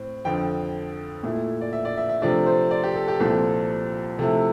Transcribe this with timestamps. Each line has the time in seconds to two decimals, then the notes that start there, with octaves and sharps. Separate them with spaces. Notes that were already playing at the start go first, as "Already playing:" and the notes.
Already playing: A2 C4
0.25 F2 D3 F3 G5
1.23 A#2 A3 E4
1.61 D5
1.73 E5
1.85 D5
1.97 E5
2.09 E5
2.22 C3 F3 A3 D4 D5
2.46 C5
2.71 D5
2.83 G4
2.96 A4
3.08 G4
3.20 C2 A#2 F3 C4 A4
4.18 C3 F3 A3 E4 A4